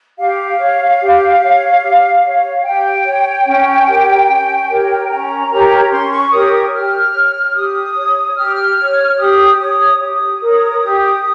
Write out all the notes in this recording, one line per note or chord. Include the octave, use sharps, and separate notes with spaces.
G4 F5
C#5
G4
C#5
G4
C#5
G4 G5
C#5
C#4
G4 A#4 C#5
C#4
G4 A#4 C#5
C#4 A#5
G4 A#4 C#5
C#4 C6
C#6
G4 A#4 C#5 D#6
D#6
G4 F6
C#5
G4 D#6
C#5
G4 F6
C#5
G4 D#6
C#5 D#6
G4 D#6
A#4 C#5
G4